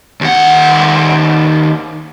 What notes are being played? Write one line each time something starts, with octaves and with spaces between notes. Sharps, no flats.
D#2 F#5